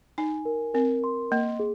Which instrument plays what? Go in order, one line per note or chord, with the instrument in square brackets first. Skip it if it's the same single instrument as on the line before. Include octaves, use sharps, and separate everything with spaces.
[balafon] D#4 [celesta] G#5
[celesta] A#4
[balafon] C4 [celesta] A#4
[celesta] C6
[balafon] A#3 [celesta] D#5
[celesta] G#4